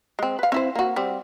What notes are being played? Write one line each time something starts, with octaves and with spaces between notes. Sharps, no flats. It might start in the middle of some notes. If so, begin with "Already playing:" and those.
G#3 C4
B4 F5
C4 E4 C5
A#3 F#4
G3 C4